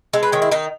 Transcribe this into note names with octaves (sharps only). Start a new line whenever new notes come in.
G#3 A4
B4
D#3 C#5
E4
D#3 D#4